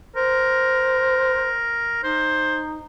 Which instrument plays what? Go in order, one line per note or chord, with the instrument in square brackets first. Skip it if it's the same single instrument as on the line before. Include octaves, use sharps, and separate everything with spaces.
[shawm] A#4 [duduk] C5
[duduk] D#4 [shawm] C5